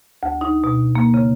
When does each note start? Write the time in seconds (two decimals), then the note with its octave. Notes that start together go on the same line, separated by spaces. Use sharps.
0.23 D2
0.41 D#4
0.64 B2
0.95 A#3
1.14 C#3